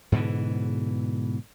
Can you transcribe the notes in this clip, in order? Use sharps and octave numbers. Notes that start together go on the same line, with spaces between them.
G#2 B2 D3 E3